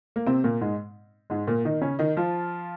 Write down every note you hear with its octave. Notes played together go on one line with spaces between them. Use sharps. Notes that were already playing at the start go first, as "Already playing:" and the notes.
A#3
C3 C4
A#2 A#3
G#2 G#3
G#2 G#3
A#2 A#3
D#3 D#4
C#3 C#4
D#3 D#4
F3 F4